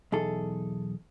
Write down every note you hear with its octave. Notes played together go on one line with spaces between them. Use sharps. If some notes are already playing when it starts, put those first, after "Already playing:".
B1 E2 G#4 A4